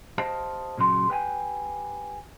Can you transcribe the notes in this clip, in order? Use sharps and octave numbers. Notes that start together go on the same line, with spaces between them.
G4 C5 D#5 F5 A5
A#2 C#3 F#3 C6
G4 B4 G5 G#5